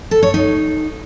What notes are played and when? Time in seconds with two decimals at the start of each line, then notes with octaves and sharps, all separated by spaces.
0.11 A4
0.23 C#5
0.34 D#4